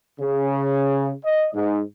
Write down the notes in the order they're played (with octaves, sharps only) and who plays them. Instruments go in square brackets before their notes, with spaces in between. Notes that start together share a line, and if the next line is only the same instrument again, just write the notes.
[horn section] C#3
D#5
G#2